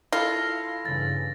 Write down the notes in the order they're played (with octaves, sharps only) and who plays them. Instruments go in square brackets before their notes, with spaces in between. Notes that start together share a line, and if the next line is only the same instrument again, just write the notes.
[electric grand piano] E4 A4 [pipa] F4 [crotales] A#6
[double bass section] G2 C#3 E3 [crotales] A6